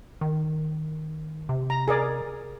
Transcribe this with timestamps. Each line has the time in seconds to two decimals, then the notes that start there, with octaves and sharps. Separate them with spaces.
0.21 D#3
1.49 C3
1.70 A#5
1.88 G#4 A#4 D5